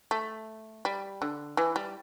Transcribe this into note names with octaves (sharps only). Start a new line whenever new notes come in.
A3
G3
D3
E3
G3